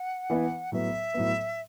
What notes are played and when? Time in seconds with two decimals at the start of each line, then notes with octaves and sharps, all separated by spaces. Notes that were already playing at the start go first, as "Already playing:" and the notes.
Already playing: F#5
0.30 E3 B3 E4 B4
0.72 A2 F#3 B3 E5
1.14 A2 F#3 B3